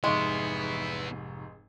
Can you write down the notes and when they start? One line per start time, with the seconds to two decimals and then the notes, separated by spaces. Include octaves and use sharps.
0.04 F1 G#2 G#3 B3 E4 C#6